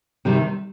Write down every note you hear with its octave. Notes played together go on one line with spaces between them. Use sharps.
C3 D#3 G3